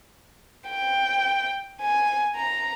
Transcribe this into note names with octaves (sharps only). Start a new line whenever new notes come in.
G5
G#5
A#5